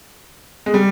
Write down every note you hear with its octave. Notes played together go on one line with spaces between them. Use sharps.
G#3
G3